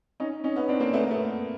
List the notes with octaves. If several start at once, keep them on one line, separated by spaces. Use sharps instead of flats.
C#4 D#4
C#4 D#4
B3 C#4
C4 D4
A#3 C4
A3 B3
A#3
A3 B3